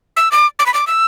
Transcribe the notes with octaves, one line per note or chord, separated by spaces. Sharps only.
E6
D6
D6
B5
D6
E6